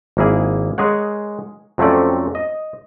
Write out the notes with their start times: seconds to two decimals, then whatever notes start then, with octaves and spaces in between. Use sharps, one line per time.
0.17 G#1 A#3 E4 G#4
0.78 G#3 G#4 A#4 C#5 F#5
1.78 F2 F#3 A3 C4 C#4 D5
2.35 D#5